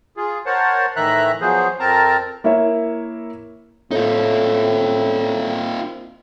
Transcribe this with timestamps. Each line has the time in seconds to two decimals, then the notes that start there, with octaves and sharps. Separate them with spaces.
0.17 F4 G#4
0.46 A#4 C5 C#5 F#5 A5
0.96 A2 D#3 E3 E5 A#5 F#6
1.41 F3 F#3 B3 G#4 C5
1.80 F2 C4 A#4 A5 A#5
2.44 A#3 E4 A#4 C#5 E5
3.91 A2 A#3 C4 D#4 F4